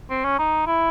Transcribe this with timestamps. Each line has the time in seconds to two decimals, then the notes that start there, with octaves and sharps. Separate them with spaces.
0.10 C4
0.24 C#4
0.39 D#4
0.67 E4